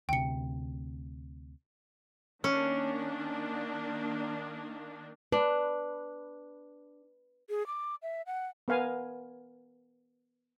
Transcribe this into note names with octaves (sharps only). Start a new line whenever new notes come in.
D2 C3 G5 C#7
D#3 A#3 C#4 D4
D4 B4
G#4
D6
E5
F#5
B3 A#4 F5 G#5